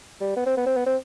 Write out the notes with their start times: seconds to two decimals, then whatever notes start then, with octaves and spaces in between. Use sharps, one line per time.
0.21 G3
0.36 B3
0.46 C4
0.57 B3
0.66 C4
0.77 B3
0.86 C4